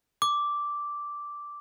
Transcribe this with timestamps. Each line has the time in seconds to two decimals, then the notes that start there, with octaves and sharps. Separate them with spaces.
0.22 D6